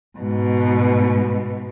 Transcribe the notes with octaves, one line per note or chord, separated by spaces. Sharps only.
G#2 B2